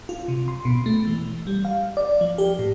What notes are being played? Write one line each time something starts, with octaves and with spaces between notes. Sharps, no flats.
F4
C3
C6
B2
A3
E3
G3
F5
D5
F3
G4
A2